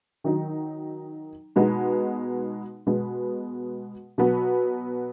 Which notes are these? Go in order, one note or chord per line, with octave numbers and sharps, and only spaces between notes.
D#3 F#3 D#4
B2 G#3 B3 D#4
B2 G#3 B3
B2 F#3 B3 F#4